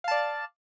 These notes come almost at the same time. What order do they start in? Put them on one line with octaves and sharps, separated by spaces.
F5 A5 D5